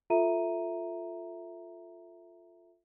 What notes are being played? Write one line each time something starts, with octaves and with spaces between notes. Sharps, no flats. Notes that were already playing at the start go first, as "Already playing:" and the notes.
F4 A4 E5 A#5 D#7